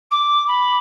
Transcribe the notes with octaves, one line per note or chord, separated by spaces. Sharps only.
D6
B5